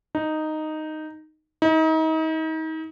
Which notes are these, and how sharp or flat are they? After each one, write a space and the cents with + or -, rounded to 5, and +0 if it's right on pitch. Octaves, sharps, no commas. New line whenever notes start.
D#4 -5
D#4 +35